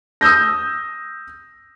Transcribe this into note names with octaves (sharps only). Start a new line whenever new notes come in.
D#6 E6 G6 A#6